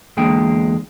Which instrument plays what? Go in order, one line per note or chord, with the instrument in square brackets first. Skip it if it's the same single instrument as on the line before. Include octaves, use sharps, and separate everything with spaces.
[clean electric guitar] E2 D3 G#3 A#3 G5